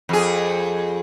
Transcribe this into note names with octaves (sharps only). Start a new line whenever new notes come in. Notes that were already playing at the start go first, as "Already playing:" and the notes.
F2 G#4